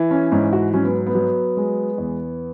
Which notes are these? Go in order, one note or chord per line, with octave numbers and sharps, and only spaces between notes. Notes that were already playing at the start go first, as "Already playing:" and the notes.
Already playing: E3
C#4
G#2 C#4
F#4
F#3 C#4
B3
B3
F#3
G#3
E2